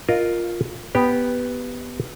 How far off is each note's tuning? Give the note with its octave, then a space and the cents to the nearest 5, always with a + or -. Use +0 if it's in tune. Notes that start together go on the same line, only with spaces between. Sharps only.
F4 +0 A#4 +0 D#5 -10
B3 +0 G4 +0